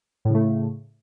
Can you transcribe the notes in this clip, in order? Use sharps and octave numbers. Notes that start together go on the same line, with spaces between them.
A2 C#3 A3